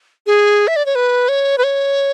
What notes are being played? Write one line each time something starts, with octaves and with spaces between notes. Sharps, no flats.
G#4
E5
D5
C#5
B4
C#5
B4
C#5